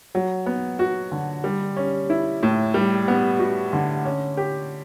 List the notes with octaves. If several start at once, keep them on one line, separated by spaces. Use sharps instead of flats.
F#3
B3
F#4
D3
G3
C#4
E4
A2
G3
B3
F#4
D3
C#4
G4